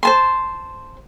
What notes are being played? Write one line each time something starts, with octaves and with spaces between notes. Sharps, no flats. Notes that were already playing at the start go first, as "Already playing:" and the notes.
C5 A5 C6